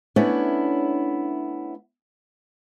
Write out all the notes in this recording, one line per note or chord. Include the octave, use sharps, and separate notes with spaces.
A3 B3 C#4 D4 E4 C#5